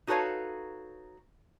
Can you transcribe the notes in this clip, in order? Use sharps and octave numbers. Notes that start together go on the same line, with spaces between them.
D#4 F#4 A4 B4 C#5 F5